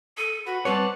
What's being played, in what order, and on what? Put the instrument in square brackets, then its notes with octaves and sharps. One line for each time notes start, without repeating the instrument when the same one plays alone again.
[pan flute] A4 [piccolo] D#7
[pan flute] F#4 [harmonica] B4 [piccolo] F#5
[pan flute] G3 [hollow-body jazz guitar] C4 B4 C#5 [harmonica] D5 A5